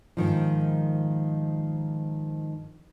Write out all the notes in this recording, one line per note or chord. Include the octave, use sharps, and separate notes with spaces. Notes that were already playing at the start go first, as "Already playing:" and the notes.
G#2 D#3 F3